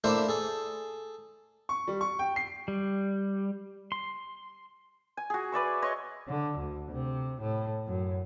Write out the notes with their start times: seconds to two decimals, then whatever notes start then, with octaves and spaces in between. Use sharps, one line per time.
0.04 A3 A#3 D4 E4 C5
0.29 G#4 A4
1.69 C#6
1.88 G3
2.01 C#6
2.19 G5
2.36 C7
2.68 G3
3.92 C6
5.17 G#5
5.30 F#4 G#4
5.52 B4 D5 E5 C#6
5.82 C#5 D#5 C6 C#6
6.28 D3
6.58 D2
6.92 C3
7.41 A2
7.87 F#2